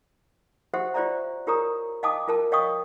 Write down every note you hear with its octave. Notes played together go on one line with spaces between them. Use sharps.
F#4 G4 C5 E5 F#5
F4 G4 C5 D5 E5 A#5
F4 G4 A#4 C#5 A#5 D#6
D#5 F5 G5 A5 D6 D#6
F4 A#4 A5
C#5 D#5 F5 G5 C#6 D#6